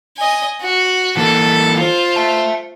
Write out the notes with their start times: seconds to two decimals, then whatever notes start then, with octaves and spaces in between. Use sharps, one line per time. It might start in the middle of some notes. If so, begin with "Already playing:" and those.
0.17 D#5 G#5
0.61 F#4
1.17 E3 A#3 A4
1.78 F4 C5
2.16 E5 A5